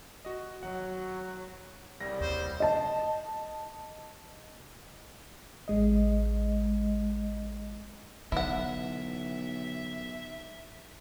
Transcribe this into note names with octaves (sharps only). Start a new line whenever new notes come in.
F#4 D#5
F#2 D#3 F#3 F#5
C2 C#3 G3 A#6
D#2 C5
D#5 A5
A1 G#3 D#5
B1 D3 E4 E5 F#5